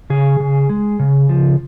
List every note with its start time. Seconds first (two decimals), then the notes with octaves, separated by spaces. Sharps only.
0.10 C#3 G#4
0.40 C#3
0.70 G#3
0.99 C#3
1.29 F3